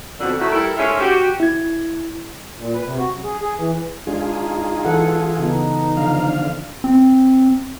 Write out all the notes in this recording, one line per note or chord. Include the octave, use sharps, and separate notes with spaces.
F2 B2 D3
A3 D#4 E4 F#4
G3 E4 A4 A#4
G#2 G#3 A3 C#4 F4 E5
F#4 G4
E4 G#6
A#2
B4
C3
F#4
F#2
G#4
G#4
E3
G#3 D4 D#4 F4 G#4
E3 A4 F#5
C#3 B3 D#4
D3 F3 F5
C4